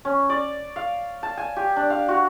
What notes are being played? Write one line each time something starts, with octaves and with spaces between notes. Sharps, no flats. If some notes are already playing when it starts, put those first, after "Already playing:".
C#4
D5
F5
A5
G#5
G4
D4
F5
F#4